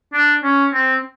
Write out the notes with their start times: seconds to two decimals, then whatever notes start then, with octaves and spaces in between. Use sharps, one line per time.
0.13 D4
0.43 C#4
0.73 C4